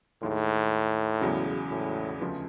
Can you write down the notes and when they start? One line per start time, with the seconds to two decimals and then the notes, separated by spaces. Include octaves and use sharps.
0.22 D#2 A2 D#3 G#3
1.21 E1 E2 C#3 F#3
1.70 A2
2.20 D2 C#3 F3 G#3 B3